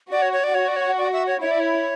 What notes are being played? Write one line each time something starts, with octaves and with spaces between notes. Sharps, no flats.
F#4 D5
C#5
C#5
D5
F#4 C#5
D5
C#5
D5
E5
C#5
E4 C#5
D5
C#5